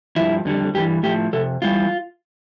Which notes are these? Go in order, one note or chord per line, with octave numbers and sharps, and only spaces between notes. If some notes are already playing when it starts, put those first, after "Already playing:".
G2 F3 E4
F2 D3 G3
G2 E3 G3 G4
A2 F3 G4
F2 C3 A4
E2 E3 G3 F4